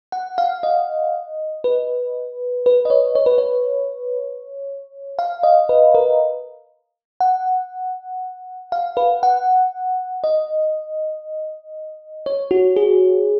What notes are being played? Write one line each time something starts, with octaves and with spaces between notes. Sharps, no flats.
F#5
F5
D#5
B4
B4
D#5
C#5
C#5
B4
C#5
F5
D#5
B4
A#4
F#5
F5
B4
F#5
D#5
C#5
F#4
G#4